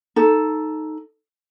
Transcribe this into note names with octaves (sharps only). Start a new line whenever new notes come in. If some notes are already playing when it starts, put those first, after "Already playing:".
D#4 A4